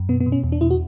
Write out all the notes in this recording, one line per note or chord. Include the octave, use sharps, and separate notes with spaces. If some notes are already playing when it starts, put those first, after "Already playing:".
Already playing: F#2
B2 B3
B3
B2
C#4
E2
D4
B2 E4
F#4